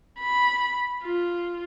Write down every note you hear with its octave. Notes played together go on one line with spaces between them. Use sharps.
B5
F4